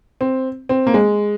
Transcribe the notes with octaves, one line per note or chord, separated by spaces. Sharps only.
C4
C4
A#3
G#3